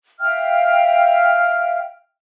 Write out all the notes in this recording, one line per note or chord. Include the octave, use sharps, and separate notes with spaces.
E5 F5 G5 F6